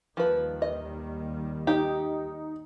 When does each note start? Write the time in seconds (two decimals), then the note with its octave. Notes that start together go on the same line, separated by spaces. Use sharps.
0.17 D#2 D#3 F3 G3 B4
0.62 D#5
1.67 D#4 G4